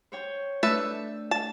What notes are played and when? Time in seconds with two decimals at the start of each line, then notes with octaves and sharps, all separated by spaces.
0.12 C5 C#5 G5
0.63 A3 D4 A4 B4 E5
1.31 A5